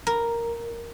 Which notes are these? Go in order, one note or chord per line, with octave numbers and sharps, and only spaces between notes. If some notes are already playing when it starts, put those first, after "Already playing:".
A#4